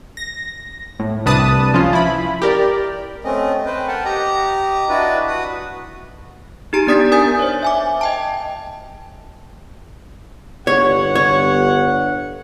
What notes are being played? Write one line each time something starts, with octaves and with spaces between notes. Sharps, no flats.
A#6
A2
C2 C3 D4 B4 A5 D#6
F3 C#4 F4
E4 B5
G4 A#4 D5
A3 C4 C#4 D#5
B4 C5 G5
A#4 F#5 G5 A5
G4 D#5 A#5
D4 E4 F#4 B4 D5 D#5
F#4 B4 D#6
D#4 G4 A#5 D7
B3 D4 D5 D#6 A6 B6
A#4 G#5 D#6 G6 A6
C5 C#5
E5 G#5 D6
D#5 G5 A5
G1 C#5 F#5
C#5